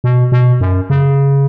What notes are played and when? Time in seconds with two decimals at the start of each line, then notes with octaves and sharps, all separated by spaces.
0.04 B2
0.32 B2
0.61 F#2
0.90 C#3